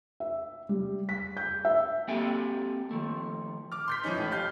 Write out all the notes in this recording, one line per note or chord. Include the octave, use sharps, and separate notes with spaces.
E5
G3
B6
G6
E5
A#3 C4 G4 A4 G5 G#5
D#3 F3 A3
D6 F6
C6 G6 B6
E3 F3 C#4 D#4
A1 A2
G4 F5 G6